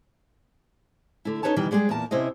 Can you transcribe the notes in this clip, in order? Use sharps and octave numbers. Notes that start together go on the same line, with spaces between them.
D3 A3 E4
C#4 D#4 A4 B4 C#5 A5
B2 D#3 E3 G3
G3 G#3 D4 F#4 G#4
E2 A#2 A#4 A5
C3 C#4 E4 C5 D#5